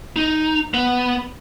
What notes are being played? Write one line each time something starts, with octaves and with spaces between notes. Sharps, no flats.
D#4
B3